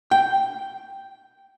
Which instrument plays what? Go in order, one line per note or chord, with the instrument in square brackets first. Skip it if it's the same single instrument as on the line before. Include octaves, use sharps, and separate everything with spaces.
[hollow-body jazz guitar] G5